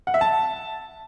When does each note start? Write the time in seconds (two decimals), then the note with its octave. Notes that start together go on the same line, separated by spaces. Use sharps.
0.07 F#5
0.14 E5
0.21 A5